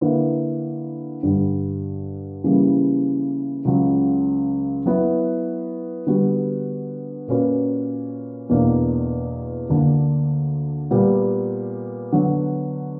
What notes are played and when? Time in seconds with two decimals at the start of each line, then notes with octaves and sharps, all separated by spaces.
0.01 D3 A#3 E4 B4
1.23 G2 D3 G3
2.44 C#3 E3 G3 A#3
3.65 C#2 C#3 F#3
4.85 F#3 B3 E4
6.07 D3 G3 B3 F#4
7.28 A#2 A#3 C#4 F#4 B4
8.49 E2 B2 A#3 D4
9.70 D2 D3 A#3 D4
10.90 A#2 G3 B3
12.12 D3 F#3 B3